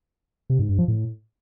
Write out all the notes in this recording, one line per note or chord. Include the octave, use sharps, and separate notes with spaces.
C3
G#2
G2
F3
A2